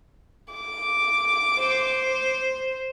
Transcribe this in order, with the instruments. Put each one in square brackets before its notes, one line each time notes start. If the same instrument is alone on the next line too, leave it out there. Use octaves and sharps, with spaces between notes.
[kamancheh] D6
[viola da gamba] C5